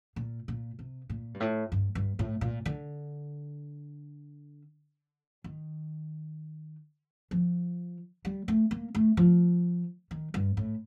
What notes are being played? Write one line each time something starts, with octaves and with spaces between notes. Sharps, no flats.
A#2
A#2
C3
A#2
G2
A2
G2
G2
A2
A#2
D3
D#3
F3
G3
A3
A#3
A3
F3
D#3
G2
A2